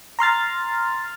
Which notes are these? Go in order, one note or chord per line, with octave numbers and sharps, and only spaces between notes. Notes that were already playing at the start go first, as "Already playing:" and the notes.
A#5 C6 F6 A6